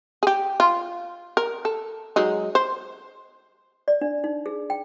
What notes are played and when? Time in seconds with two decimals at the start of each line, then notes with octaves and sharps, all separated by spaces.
0.23 G4 G#4
0.60 F4
1.37 A#4
1.65 A4
2.16 F#3 G#3 D#4
2.55 C5
3.88 D5
4.01 D4
4.24 D#4
4.46 G#4
4.70 G5